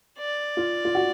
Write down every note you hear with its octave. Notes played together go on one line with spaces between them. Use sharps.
D5
F4
F4
F#4